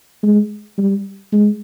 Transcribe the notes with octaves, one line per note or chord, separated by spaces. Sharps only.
G#3
G3
G#3